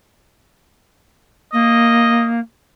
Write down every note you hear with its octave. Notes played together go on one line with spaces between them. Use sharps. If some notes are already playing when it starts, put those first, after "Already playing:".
A#3 D#5